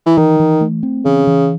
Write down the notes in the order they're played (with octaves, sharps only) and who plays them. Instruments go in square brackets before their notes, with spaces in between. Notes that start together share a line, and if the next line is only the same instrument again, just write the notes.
[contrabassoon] E3
[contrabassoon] D#3 [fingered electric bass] E3
[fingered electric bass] E3
A3
C4
[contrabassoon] C#3 [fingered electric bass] E3
[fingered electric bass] E3